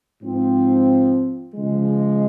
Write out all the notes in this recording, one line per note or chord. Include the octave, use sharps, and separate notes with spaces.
G#2 F3 C4
C#3 F3 G#3